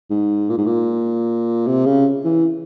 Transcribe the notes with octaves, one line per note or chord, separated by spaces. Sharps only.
G#2
A#2
G#2
A#2
C3
C#3
E3